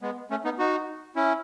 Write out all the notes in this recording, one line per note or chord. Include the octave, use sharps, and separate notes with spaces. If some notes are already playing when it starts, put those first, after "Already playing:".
G#3 B3
A3 C#4
B3 D#4
D#4 F#4
C#4 E4